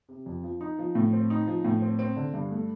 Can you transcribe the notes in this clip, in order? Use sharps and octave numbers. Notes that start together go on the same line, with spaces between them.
C3
F2
F3
D#4
F3
A2
C4
D#4
F3
A2
C4
C4
D3
G2
A3